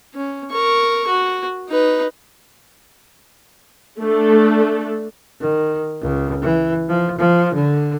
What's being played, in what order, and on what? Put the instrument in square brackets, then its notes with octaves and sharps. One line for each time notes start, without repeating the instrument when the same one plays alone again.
[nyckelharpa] C#4
A#4 C#6
F#4
D#4 B4
[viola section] A3 D4 A4
[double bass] D#3
C#2
E3
F3
F3
D3